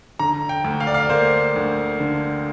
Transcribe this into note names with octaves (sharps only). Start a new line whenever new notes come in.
D3 A#5
G5
D2
F5
D5
F5
A#3 C5
D2
D3